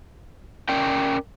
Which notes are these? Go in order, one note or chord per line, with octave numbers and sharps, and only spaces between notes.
C#4 A#4 D5 G5